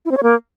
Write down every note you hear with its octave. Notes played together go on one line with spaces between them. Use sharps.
E4
C4
C#5
A#3